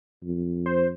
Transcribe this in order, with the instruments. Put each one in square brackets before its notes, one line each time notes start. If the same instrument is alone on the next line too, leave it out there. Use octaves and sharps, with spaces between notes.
[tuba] F2
[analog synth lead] C5